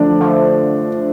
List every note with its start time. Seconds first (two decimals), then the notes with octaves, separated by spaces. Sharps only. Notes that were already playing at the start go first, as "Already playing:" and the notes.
Already playing: D3 F3 A3 D4 D5
0.20 D3 F3 A3